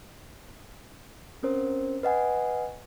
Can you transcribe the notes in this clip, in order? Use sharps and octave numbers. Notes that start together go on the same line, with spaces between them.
C4 C#4 A#4 C5
B4 D#5 F#5 G#5